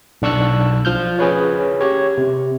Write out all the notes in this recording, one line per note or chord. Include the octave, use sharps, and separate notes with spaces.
B1 D4 C#6 E6 F#6
F3 F6 G6
C#4 G#4 B4 C#5
G4 C#5
C3